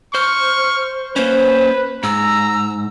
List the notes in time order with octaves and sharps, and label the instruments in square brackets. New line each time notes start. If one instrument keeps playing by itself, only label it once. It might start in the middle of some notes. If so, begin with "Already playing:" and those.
[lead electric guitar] C5 [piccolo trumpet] C#6 [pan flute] F6
[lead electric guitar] A#3 C#4 [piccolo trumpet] B4 [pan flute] C5
[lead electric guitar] G#2 [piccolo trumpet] A#5 [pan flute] E6